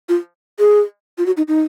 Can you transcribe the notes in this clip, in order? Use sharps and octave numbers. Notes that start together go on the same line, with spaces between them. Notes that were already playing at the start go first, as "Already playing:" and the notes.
F4
G#4
F4
F#4
D#4
D#4